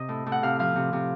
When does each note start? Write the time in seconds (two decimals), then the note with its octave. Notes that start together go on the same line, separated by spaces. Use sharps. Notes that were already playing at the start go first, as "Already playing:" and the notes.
Already playing: C3 D#5
0.09 A2
0.26 A2
0.32 F#5
0.43 C3 F5
0.59 F3 F5
0.76 C3
0.93 C3